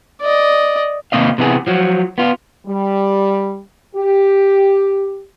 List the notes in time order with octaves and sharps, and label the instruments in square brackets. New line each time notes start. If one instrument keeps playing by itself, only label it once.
[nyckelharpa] D5 D#5
[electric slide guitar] C3 D#3 A#3 C4 D#5 F5
C3 E3 B3 D4 G#4
F3 F#3
B3 F4
[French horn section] G3
G4